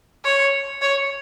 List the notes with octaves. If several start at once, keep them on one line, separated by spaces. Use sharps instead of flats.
C#5
C#5